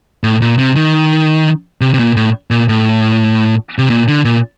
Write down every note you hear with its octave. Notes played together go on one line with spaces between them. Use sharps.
A2
A#2
C3
D#3
C3
C3
A#2
A2
A#2
A2
C3
A#2
D3
A#2